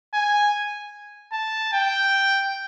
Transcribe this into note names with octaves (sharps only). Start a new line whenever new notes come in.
G#5
A5
G5